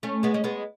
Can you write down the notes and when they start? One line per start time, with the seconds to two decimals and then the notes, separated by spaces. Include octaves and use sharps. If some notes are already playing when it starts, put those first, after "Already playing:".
0.03 A3 C#4
0.23 G#3 B3
0.34 C#4
0.44 G#3 B3